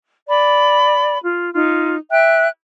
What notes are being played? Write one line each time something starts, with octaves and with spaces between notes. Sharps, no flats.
D5 B5
F4
D#4 F4
E5 G5 F#6